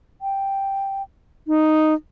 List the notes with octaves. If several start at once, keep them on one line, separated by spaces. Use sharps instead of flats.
G5
D#4